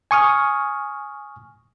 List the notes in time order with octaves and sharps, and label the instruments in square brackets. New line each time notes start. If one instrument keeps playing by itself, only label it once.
[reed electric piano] G#5 C#6 D#6 F6